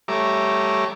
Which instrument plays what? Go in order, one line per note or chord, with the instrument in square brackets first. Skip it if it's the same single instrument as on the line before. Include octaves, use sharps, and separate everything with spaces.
[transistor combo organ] G3 A3 C#5 E5 A#5 D6